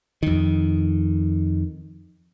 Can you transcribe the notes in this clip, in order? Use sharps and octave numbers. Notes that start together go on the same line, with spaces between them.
F2 D#3